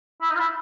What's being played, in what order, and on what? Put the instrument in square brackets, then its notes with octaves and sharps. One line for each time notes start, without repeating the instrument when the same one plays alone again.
[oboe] E4
D#4
F4
E4